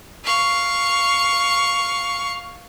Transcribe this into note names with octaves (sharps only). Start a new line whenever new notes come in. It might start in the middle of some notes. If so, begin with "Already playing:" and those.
F5 C#6